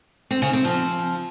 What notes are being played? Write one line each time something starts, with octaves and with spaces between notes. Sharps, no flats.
C4
C#3
C4
F3